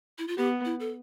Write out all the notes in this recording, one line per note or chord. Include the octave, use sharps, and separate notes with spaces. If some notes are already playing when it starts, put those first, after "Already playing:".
E4
F4
B3 G4
E4
A4